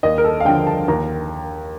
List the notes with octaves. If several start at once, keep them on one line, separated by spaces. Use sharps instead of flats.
D#2 D#5
A#4
A4
F5
D3 F3 G5
A5
D#2 A#5